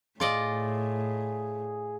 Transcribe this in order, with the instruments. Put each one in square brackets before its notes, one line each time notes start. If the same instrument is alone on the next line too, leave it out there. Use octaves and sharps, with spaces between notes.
[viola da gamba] A2 [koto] F4 D5 D#5 [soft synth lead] G#4